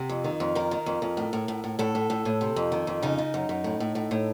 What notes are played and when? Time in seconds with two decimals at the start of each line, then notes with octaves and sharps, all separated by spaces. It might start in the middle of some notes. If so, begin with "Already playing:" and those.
Already playing: C3
0.09 F2
0.24 D#3
0.40 F2
0.55 D#3 A#4
0.71 D#3
0.86 F2
1.02 F2
1.17 A2
1.33 A2
1.48 A2
1.64 A2
1.79 A2 A4
1.95 A2
2.10 A2
2.25 A2
2.41 C3
2.56 F2
2.72 D#3
2.87 F2
3.02 C#3 D#4
3.18 C#3
3.34 F#2
3.49 F#2
3.64 A2
3.80 A2
3.95 A2
4.11 A2